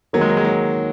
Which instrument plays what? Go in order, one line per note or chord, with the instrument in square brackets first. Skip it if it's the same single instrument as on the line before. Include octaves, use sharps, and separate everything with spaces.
[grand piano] D#3 A#3 D#4 G#4 [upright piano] F#3
[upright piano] G#3
F#3
G#3
F#3